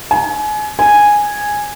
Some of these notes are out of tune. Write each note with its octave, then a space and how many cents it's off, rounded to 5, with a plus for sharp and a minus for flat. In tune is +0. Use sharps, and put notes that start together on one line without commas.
G#5 +30
G#5 -5